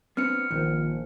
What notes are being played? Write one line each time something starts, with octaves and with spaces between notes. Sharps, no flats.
B3 C4 D4 F6 C#7
A#1 D#3